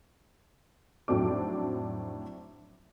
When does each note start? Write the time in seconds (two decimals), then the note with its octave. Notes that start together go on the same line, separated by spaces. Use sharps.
1.08 F1 A2 F#3 C4 D4 D6